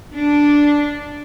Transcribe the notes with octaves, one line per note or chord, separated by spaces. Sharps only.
D4